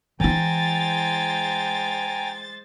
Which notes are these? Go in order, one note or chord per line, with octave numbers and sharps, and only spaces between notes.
E3 G#3 E4 C5 G5 G#5 A#5 A6